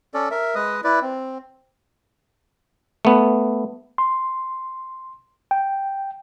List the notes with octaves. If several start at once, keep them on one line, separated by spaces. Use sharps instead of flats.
C#4 A4 D5
A#4 E5
G#3 B4 D#5 D#6
E4 B4 D5
C4
A3 B3
C6
G5